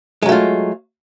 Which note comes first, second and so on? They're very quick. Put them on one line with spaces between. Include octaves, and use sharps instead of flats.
G#3 F#3 A3 F4